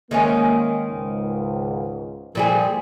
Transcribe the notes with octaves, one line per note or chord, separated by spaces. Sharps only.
D#3 G#3 A#3 C#4
C#2 G#2
A#2 F3 G3 G#4